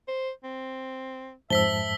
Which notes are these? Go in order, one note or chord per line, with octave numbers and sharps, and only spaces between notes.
C5
C4
F2 G#2 C5 E5 A5 E6 B6 G7